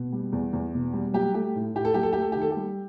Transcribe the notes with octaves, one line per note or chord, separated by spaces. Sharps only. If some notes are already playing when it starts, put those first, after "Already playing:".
Already playing: B2
G3
E2
E2
B2
G3
F#3 G4
A3 G4
A2
A2 G4
A4
F#3 G4
A4
A3 G4
A4
D#3 G4
A4
G4
G3